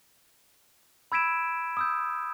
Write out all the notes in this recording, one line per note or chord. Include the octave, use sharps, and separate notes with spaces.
B5 E6 G#6 B6 D7 E7
D#6 E6 G6